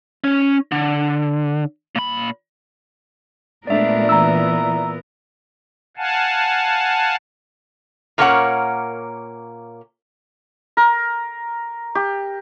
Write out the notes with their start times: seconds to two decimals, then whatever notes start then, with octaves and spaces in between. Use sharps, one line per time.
0.24 C#4
0.72 D3
1.96 A#2 B5
3.67 A#2 G#3 A3 B3 D4 A#4 D5 E5
4.09 E3 A#5 E6
5.97 F5 F#5 G#5 A5
8.18 A#2 A#3 C#4 A#4 C#5 F#5
10.77 A#4
11.95 G4